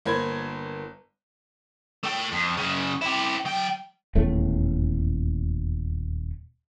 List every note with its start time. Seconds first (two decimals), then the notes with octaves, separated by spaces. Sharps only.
0.05 G1 A#3 C5 B5 G#6
2.03 A3 G5
2.32 F2
2.57 F#2 C#3
3.01 E4 G4
3.46 F#3 G5
4.15 D#1 E2 A2 A3